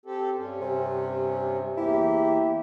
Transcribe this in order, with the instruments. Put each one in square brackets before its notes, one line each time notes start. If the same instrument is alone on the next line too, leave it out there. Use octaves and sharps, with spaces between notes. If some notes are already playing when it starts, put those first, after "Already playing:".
[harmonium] C4 G4 A4
G2 C#4
[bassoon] C3
[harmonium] E2 A#3 G4 [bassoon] E4